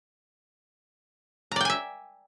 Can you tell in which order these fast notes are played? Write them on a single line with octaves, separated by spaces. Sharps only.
A#5 D5 G5 G#5 E5